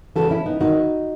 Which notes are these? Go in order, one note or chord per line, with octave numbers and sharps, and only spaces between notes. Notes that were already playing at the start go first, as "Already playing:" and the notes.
E2 C#3 E3 F#4 A4
C#4 E4
B3 D#4
E2 D#3 D#4 F#4